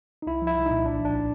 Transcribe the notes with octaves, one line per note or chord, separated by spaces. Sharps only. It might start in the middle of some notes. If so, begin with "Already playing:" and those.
D#4
C2 E4
F3
E4
C2
A#2 D#4
A1 D4
F3
D4